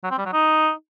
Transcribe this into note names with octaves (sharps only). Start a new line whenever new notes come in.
F#3
C4
G3
F#3
D#4